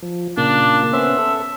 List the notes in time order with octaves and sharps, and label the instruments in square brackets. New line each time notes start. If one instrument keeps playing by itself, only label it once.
[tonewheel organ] F3
[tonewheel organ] A#2 C#3 A#3 [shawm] D4
[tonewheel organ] B3 C#4 C5 [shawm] E5
[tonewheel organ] A4